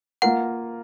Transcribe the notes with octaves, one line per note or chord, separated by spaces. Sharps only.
A#3 F4 A#4 F#5